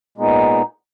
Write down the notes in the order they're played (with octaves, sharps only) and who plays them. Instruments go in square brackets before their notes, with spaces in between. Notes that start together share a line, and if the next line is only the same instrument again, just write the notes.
[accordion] A#2 G#3 B3 D#4